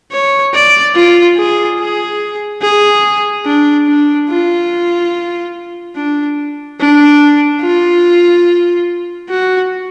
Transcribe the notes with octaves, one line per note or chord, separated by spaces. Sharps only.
C#5
D5
F4
G#4
G#4
G#4
D4
D4
F4
D4
D4
F4
F#4